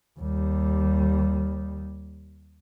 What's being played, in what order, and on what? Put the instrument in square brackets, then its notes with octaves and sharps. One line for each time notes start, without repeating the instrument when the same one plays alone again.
[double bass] D#2 G3